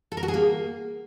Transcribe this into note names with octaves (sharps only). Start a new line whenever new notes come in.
A4
A#4
F#4
G#4
A#3